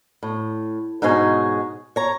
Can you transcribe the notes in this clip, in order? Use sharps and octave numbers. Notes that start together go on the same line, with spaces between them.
A2
G#2 B2 D#4 G#4 C#5
C#5 A#5